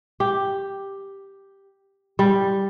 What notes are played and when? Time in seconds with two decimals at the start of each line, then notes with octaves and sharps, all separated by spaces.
0.20 G4
2.19 G3